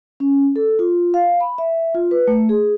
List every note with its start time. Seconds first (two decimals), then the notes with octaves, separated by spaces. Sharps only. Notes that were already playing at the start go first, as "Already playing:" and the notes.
0.20 C#4
0.56 A4
0.79 F4
1.14 F5
1.41 B5
1.58 E5
1.95 F4
2.11 B4
2.27 A3
2.49 G#4